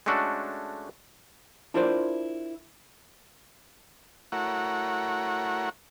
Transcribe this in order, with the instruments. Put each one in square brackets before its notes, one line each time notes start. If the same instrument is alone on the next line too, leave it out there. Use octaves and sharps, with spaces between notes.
[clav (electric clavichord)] G#3 A3 C#4 D4 F#4 A4
[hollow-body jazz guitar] D4 E4 F4 A#4 C5 D5
[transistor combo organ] A3 E4 F#4 A#4 C#5 F#5